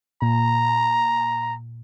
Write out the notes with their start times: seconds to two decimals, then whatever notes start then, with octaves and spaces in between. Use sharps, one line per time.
0.22 A#2 A#5